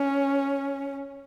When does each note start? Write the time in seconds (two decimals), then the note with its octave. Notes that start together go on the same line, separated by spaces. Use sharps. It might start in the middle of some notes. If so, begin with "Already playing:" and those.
Already playing: C#4